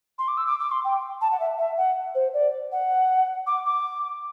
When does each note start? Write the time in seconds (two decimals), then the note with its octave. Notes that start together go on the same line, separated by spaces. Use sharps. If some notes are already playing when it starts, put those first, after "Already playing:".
0.19 C6
0.28 D6
0.37 E6
0.47 D6
0.60 D6
0.71 C6
0.85 G5
1.21 A5
1.32 F#5
1.40 E5
1.59 E5
1.77 F#5
2.15 C5
2.34 D5
2.72 F#5
3.47 D6
3.66 D6